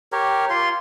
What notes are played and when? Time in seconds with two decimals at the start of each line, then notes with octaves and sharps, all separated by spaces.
0.12 G4 A#4 C#5
0.50 F4 C6